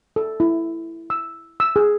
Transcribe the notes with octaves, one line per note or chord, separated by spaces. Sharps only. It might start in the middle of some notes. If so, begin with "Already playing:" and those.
A4
E4
E6
E6
G#4